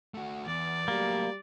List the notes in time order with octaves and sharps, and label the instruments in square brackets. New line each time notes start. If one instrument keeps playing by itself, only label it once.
[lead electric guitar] A3 F#4
[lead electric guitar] E2 [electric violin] D5
[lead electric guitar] F#3 A3 [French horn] G3 [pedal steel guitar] A#3